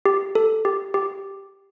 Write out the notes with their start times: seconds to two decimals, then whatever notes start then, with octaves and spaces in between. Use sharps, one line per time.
0.05 G4
0.35 A4
0.65 G4
0.94 G4